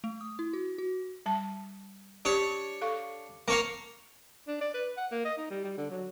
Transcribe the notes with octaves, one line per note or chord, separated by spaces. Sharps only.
A3
D#6
E4
F#4
F#4
G3 A5
D4 G4 C#5 D5
A4 F5 C#6
A#3 C4 C#5 F5
D4
D5
B4
F#5
A#3
D#5
D#4
G3
G3
D3
F#3